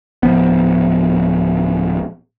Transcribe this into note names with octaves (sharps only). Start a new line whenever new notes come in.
D1 D#2 F3 B3